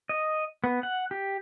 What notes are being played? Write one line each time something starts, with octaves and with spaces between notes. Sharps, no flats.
D#5
B3
F#5
G4